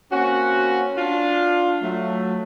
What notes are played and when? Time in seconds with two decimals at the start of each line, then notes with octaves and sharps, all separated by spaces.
0.11 A#3 C4 C#4 F#4
0.97 D4 F4
1.82 F#3 A3